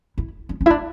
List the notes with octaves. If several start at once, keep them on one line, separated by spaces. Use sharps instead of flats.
E4
D4
C#4
E4
D4